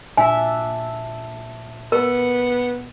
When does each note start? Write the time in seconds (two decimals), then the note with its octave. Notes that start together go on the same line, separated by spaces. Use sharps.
0.17 A#2 D4 E5 G#5
1.92 B3 A#4